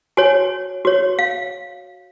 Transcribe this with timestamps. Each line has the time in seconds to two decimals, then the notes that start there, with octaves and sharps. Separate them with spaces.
0.17 F#4 C#5 G#5
0.85 F#4 C#5
1.19 F5